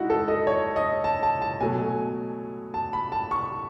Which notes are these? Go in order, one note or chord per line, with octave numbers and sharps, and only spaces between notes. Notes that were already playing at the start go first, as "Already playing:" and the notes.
Already playing: G#3 D#4 E4 F#4
A4
D#5
C#5
D#5
A5
A5
A5
B2 F#3 A3 G#5
A5
B5
A5
C#6